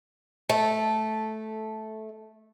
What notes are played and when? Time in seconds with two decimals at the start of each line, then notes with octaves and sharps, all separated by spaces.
0.49 A3 A4